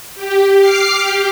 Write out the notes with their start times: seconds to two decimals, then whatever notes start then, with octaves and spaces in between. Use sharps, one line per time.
0.15 G4
0.60 D6 F6 C7
0.96 G4